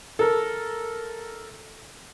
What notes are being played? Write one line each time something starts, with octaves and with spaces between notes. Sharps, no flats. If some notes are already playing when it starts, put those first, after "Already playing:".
A4 A#4